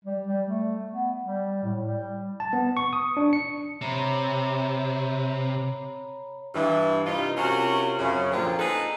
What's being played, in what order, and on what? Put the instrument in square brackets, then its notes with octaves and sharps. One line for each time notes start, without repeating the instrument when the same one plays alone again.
[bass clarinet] G3
G3
A3
B3
G3
A2
G3
[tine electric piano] A5
B3
C#6
D#6
D4
C#7
[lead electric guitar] C3 [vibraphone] C#5 A#5 B5
[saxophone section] G2 E3
G2 C3 D#4 F4
C3 C#4 F4 F#4 A#4
F#2 C#3
A#2 D3 F3 C4 F4
D#4 G#4 A4 B4